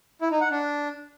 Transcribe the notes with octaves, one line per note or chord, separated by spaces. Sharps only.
E4
D#4
F#5
D4